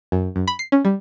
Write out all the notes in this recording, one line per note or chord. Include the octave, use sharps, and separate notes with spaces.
F#2
F#2
B5
C7
C#4
G3